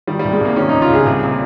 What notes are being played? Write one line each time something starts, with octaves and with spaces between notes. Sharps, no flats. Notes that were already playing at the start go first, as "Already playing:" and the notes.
D#3 G3
C2 G3
G#3
C2 A#3
D#3 C#4
C#2 D#4
F4
C#2 G#4
C2
A#2